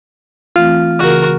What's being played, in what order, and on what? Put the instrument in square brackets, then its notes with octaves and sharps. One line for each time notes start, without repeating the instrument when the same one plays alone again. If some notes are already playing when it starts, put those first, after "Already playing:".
[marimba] E3 A3 C4 [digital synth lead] F4
[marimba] C#3 E3 G#4 [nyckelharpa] F#4 A#4